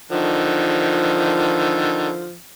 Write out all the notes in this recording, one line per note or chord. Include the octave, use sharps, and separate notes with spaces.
D3 D#3 F3